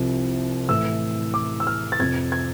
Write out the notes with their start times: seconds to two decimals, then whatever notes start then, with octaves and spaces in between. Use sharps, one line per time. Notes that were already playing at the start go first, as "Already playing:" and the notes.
Already playing: C2 C3 F3
0.69 A2 E3 A3 E6
1.34 D6
1.60 E6
1.67 F6
1.92 A6
1.99 F2 C3 F3 G#6
2.32 G#6